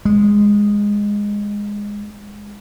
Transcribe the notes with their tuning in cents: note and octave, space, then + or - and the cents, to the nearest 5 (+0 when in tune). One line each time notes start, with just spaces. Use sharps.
G#3 -15